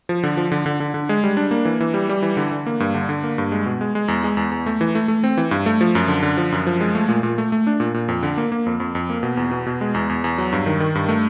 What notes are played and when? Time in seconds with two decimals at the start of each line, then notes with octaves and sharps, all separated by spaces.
0.09 F3
0.23 D3
0.37 F3
0.52 D3
0.66 D3
0.80 D3
0.94 D3
1.09 G#3
1.24 G3
1.37 D4
1.51 A#3
1.65 E3
1.80 E3
1.94 G3
2.09 G3
2.22 E3
2.37 D3
2.51 D3
2.67 A#3
2.80 G2
2.94 D3
3.09 D3
3.23 A#3
3.38 G2
3.52 G#3
3.66 B2
3.81 G#3
3.95 G#3
4.08 E2
4.24 G#3
4.37 E2
4.51 E2
4.66 A3
4.81 E3
4.95 A3
5.08 A3
5.24 C4
5.37 E3
5.51 G2
5.66 A3
5.81 F3
5.95 F#2
6.08 D3
6.23 D3
6.37 F3
6.52 F#2
6.67 F3
6.81 G#3
6.95 A3
7.09 A#2
7.23 A#2
7.38 A3
7.52 A3
7.67 D4
7.80 A#2
7.94 A#2
8.08 F2
8.23 D3
8.37 A#3
8.52 A#3
8.66 F2
8.80 F2
8.95 F2
9.10 A#3
9.23 B2
9.37 E2
9.51 B2
9.66 B2
9.81 G#3
9.95 E2
10.09 E2
10.24 E2
10.38 F#3
10.52 G2
10.66 D#3
10.80 D#3
10.95 G2
11.08 A3